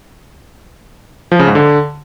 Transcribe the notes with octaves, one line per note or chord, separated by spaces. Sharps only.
F3
C#3
G#2
D3